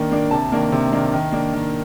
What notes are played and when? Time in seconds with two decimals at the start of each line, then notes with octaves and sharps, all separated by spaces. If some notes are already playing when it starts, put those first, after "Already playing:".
Already playing: D#3 A#3 D4
0.11 A#3 D4
0.31 C3 A5
0.52 D#3 A#3 D4
0.72 C3
0.92 D#3 A#3 D4
1.13 D#3
1.32 A#3 D4
1.53 D#3